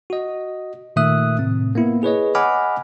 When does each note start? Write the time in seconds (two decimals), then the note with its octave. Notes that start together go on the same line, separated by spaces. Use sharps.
0.10 F#4 D#5
0.96 A#2 D#3 A3 E5 D#6 F#6
1.39 A2 C3 C4
1.75 A#3 B3 E4
2.03 G#4 B4 C#5 D#5
2.35 D#5 F#5 G#5 B5 D6 F6